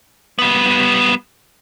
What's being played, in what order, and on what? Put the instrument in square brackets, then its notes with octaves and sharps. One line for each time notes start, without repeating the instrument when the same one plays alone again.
[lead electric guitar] G3 B3